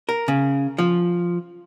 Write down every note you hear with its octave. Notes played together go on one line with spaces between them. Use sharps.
A#4
C#3
F3